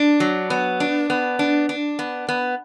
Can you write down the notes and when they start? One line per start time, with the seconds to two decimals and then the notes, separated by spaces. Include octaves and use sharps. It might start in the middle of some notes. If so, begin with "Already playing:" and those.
Already playing: D4
0.20 F#3
0.50 B3
0.80 D4
1.10 B3
1.39 D4
1.69 D4
1.99 B3
2.29 B3